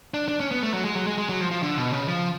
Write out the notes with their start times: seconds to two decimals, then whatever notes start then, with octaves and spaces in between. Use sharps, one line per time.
0.14 D4
0.28 D4
0.40 C#4
0.51 B3
0.63 A3
0.74 F#3
0.85 G#3
0.96 F#3
1.07 G#3
1.18 G#3
1.29 F#3
1.40 F3
1.51 F3
1.63 D3
1.77 B2
1.92 C#3
2.08 F3